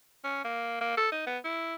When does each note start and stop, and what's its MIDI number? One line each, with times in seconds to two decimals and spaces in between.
0.24 0.42 61
0.45 0.81 58
0.81 0.92 58
0.97 1.08 69
1.12 1.23 63
1.27 1.38 59
1.44 1.75 64